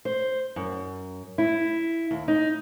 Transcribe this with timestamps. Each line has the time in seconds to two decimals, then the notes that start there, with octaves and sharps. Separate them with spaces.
0.05 C5
0.56 F#2
1.38 E4
2.11 D#2
2.28 D#4